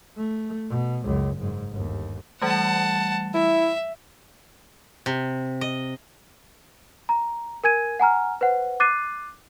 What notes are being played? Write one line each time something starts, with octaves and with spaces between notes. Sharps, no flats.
A3
B2
C#2 F#2
F#1 G#2
G1 D#2
E3 G3 A3 F#5 A5
E4 E5
C3
D#5
A#5
A#4 G#5 G#6 D#7
F#5 G#5 A#5 F6
B4 C5 F#5
D6 F#6 A6 C7 D#7